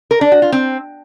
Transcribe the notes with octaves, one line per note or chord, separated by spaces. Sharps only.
A#4
D4
F#4
F4
C4